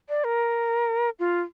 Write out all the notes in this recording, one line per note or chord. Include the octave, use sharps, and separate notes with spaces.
D5
A#4
F4